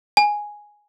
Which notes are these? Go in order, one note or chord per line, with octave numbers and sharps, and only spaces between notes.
G#5